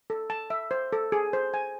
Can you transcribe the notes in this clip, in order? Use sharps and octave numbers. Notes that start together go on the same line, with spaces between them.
A4
A5
E5
C5
A4
G#4
C5
G#5